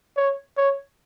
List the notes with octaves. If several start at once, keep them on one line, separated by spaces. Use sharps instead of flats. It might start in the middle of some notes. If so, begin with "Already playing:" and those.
C#5
C#5